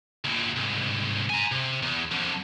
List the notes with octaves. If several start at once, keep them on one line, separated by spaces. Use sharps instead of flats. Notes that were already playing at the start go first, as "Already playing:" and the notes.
D2 A#2
C2 G#2
G#5 A#5
C3
E2
F2 D3